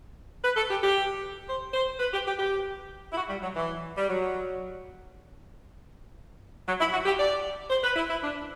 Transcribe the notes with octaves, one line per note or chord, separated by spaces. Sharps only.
B4
A4
G4
G4
C5
C5
B4
G4
G4
G4
E4
F#4
G3
F#3
E3
G3
F#3
F#3
E4
F#4
G4
D5
C5
B4
E4
E4
D4